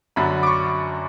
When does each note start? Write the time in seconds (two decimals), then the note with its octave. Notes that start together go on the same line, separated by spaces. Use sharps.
0.16 F#2 D3 F#3 B5
0.43 D6
0.46 C#6